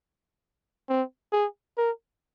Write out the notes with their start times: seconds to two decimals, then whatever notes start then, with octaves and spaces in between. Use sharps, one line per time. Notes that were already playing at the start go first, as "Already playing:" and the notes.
0.89 C4
1.33 G#4
1.77 A#4